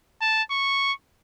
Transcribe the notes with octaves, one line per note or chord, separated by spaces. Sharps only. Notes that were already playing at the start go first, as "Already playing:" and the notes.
A5
C#6